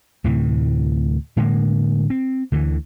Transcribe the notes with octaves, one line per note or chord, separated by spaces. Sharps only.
D2 A2 C3 E3
A2 D3 G#3 A#3
C4
D2 D3 E3